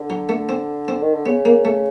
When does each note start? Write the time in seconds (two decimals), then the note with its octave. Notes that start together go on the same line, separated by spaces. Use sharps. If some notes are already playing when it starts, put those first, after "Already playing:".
Already playing: D3
0.10 F#3
0.29 A3
0.49 C4
0.88 C4
1.02 D#3
1.14 D3
1.26 C#3 B3
1.45 A#3
1.65 A3